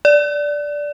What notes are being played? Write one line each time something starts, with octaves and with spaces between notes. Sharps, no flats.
D5